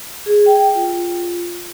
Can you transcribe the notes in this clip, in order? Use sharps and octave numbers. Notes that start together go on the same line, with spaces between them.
G#4
G5
F4